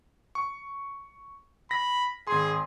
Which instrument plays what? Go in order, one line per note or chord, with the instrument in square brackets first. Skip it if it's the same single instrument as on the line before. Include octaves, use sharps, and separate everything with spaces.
[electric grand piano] C#6
[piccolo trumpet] B5 [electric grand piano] A#6
[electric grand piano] G#1 C6 [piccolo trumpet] G#4